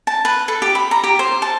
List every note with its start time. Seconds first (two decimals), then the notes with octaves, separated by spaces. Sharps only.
0.07 A5
0.25 B4
0.48 A4
0.62 G4
0.75 B5
0.91 A#5
1.03 G4
1.19 C5
1.42 A5